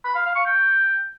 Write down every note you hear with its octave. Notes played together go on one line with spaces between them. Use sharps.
B5
F5
F5
C#6
G5